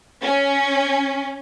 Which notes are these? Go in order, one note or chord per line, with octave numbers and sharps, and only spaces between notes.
C#4